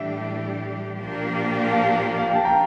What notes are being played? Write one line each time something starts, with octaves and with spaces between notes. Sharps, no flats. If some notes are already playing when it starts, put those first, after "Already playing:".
Already playing: A2 E3 G3 D4 G4 E5
A#2 F3 A#3 D4 G4
F5 A5
F5
G5
A5
G5 A#5